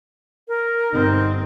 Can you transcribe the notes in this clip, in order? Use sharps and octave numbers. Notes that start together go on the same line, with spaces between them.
A#4
G1 C4 D#4